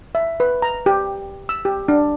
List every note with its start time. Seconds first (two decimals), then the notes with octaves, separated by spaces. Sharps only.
0.15 E5
0.40 B4
0.62 A#5
0.86 G4
1.49 E6
1.65 G4
1.88 D4